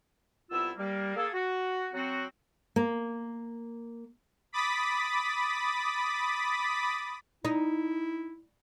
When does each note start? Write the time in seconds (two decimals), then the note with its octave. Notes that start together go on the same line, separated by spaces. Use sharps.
0.51 C2 B3 E4 F4 E6
0.78 G3 A#3
1.16 A#3 G#4 A4
1.34 F#4
1.93 F#3 C4 F#4
2.76 A#3
4.53 B5 D6 D#6 A6 B6
7.45 D#4 E4